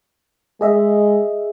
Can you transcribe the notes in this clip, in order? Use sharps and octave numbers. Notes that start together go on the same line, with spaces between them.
G#3 G#4 D#5 E5